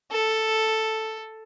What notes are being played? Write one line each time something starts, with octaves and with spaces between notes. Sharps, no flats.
A4